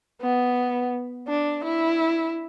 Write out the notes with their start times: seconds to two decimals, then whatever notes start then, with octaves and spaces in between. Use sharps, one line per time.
0.22 B3
1.28 D4
1.64 E4